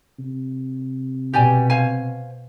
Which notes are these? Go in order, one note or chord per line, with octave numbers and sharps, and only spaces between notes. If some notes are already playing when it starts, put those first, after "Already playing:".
C3
B2 G4 D5 G#5
C5 F5 G#5